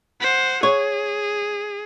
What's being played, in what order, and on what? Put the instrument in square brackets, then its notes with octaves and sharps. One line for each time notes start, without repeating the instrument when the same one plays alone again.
[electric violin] C5 F#5
[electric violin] G#4 [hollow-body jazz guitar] C#5